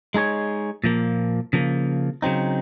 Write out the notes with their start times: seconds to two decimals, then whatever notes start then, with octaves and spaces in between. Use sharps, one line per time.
0.14 G#3 D#4 G#4 C#5
0.84 A#2 F3 A#3
1.53 C#3 F3 A#3
2.22 C#3 F#3 C4 D#4